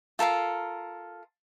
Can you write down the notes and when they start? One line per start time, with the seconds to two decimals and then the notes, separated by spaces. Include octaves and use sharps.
0.19 F4 A4 A#4 F5